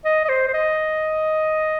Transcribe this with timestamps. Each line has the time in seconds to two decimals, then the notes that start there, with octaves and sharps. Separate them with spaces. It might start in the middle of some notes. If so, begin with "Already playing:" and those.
0.05 D#5
0.25 D#5
0.29 C5
0.48 C5
0.54 D#5